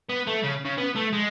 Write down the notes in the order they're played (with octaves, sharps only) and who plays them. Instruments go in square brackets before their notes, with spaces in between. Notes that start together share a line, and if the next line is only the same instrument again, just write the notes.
[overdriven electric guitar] B3
A3
C#3
C#3
B3
A3
G#3